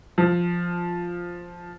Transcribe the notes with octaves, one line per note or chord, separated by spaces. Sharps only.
F3